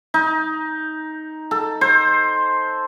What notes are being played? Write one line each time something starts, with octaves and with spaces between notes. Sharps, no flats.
D#4
A4
C5